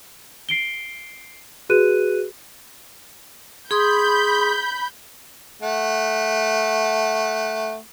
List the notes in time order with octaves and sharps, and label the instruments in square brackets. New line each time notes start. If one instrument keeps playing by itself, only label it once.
[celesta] C7 D7 G7
F#4 G#4 B4 F#6 D#7
[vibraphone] G#4 C6 D#6 [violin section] B5 G6
[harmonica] A3 F#5